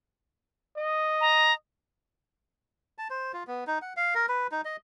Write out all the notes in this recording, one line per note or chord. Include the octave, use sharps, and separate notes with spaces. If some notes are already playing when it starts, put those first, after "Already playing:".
D#5
A#5
A5
C5
F4
B3
D#4
F#5
F5
A#4
B4
D#4
D#5